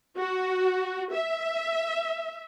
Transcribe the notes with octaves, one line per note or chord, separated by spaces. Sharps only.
F#4
E5